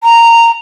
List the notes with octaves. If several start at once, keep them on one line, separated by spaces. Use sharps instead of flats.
A#5